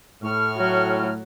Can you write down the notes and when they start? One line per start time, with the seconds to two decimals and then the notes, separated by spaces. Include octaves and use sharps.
0.23 A2 C#6 F6
0.58 F#3